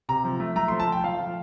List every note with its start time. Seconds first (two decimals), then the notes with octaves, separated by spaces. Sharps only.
0.09 C3 A#5
0.25 F3
0.40 A3
0.56 A3 A#5
0.68 F3 C6
0.80 A5
0.87 F3
0.92 G5
1.04 F3 F5
1.20 F3